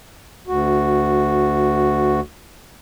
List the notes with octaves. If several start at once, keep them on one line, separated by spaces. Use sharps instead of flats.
D2 F#4